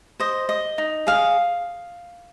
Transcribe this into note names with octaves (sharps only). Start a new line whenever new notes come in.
C5 D#5
D#5
D#4
G#4 F5